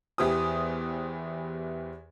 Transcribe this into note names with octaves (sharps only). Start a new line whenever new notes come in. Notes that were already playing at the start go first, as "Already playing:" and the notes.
E2 E3 G4 C5 D#6